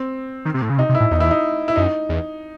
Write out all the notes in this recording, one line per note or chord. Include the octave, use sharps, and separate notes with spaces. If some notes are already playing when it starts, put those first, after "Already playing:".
Already playing: C4
D#3
C3
A2
C#3
C3 D#4
C3
E4
A2
E2 D#4
E4
D#4
E4
F#2 D#4
E2